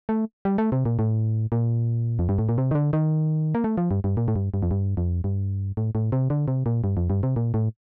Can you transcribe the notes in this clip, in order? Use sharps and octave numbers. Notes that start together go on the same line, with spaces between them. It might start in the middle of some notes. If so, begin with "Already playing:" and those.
A3
G3
A3
C3
A#2
A2
A#2
F2
G2
A2
A#2
C3
D#3
D3
D#3
A#3
A3
F3
G2
G2
A#2
A2
G2
G2
F2
G2
F2
G2
A2
A2
C3
D3
C3
A#2
G2
F2
G2
C3
A#2
A2